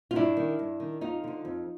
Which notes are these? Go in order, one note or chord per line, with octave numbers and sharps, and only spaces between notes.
F4
G2 D4 E4
D#3
G2
D#3
F2 D#4 F4
D3 F3
F2